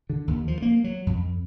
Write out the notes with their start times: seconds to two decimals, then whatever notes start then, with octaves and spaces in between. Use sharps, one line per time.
0.10 D3
0.28 D#2
0.48 F3
0.62 A#3
0.84 F#3
1.07 F2